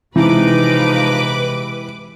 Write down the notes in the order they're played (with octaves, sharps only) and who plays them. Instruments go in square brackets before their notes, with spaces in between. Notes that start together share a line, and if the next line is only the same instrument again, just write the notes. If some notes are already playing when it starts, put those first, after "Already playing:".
[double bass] C3 G#3 [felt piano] E3 [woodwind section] F3 D#4 [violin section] B4 D6